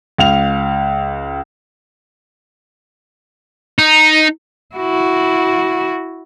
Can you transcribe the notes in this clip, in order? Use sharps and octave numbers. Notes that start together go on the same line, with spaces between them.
C#2 F5 F7
D#4
E4 F#4